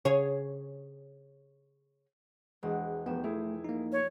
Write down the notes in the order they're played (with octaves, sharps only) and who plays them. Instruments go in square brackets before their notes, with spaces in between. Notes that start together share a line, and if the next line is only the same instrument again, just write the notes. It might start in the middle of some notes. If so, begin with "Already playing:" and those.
[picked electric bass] C#3 [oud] G#4 C#5
[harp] E1 F#5 [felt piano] G#3
[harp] F1 G5 E7 [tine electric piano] B3
[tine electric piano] A3 [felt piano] E4 G#4
[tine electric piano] A#3 D#4
[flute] C#5